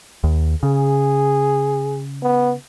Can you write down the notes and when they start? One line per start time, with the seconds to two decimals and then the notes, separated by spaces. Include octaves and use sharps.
0.24 D#2
0.63 C#3 G#4
2.22 B3